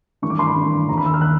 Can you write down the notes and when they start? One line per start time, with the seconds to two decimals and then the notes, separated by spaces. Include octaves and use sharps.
0.22 A1 G2 D#3 C#6
0.30 D6
0.39 C6
0.47 B5
0.55 A1 G2 D#3
0.89 D#2 D#3 A#5
0.98 B5
1.05 E6
1.14 F6
1.21 F#6